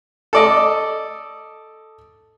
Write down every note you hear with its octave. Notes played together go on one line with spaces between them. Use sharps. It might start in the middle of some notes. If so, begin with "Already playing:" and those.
A4 D5 D#5